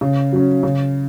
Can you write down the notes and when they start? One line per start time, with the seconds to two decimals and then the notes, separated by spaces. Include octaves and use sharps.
0.01 C#3
0.32 F#3 C#4
0.63 C#3